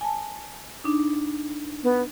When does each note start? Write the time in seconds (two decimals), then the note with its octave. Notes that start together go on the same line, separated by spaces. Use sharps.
0.01 G#5 A5
0.84 D4 D#4
1.83 B3